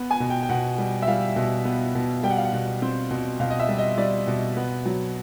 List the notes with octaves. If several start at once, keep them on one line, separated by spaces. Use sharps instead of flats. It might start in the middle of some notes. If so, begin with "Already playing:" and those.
Already playing: B3
G#5
B2
G5
G5
B2 F#5
G3
E5
G3 F5
B2
B3
B2
G3 G5
F#5
F5
F#5
B2
C4
B2
B2 F5
D#5
E5
G3
D#5
G3 D5
B2
B3
F#3